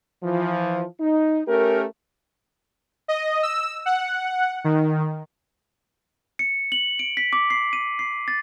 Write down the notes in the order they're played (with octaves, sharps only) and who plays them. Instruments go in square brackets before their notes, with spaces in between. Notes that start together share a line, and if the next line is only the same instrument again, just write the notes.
[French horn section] E3 F3
D#4
A3 C#4 G4 A#4
[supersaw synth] D#5
E6
F#5
D#3
[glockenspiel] C#7
F#7
D7
B6
D6
C7
D#7
C7
A6